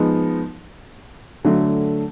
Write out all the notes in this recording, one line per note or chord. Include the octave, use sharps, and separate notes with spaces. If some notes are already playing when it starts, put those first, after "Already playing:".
Already playing: F3 G#3 B3 D#4
D3 F#3 A3